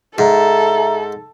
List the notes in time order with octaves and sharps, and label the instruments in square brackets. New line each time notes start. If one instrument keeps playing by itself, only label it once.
[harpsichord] G#2 [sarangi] A4 [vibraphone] E5 A#5